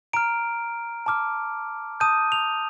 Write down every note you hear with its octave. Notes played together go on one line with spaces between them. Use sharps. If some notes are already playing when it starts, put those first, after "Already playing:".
A#5 F6 D7
A5 D6 F6
A5 D#6 G6 D#7
F7